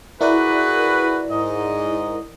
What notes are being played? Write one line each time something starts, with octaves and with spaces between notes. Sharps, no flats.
E4 F#4 G#4 A#4 B4 D5
G#2 D#5